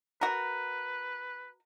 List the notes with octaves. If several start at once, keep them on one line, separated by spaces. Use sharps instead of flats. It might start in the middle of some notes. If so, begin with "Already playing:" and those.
F#4 A#4 B4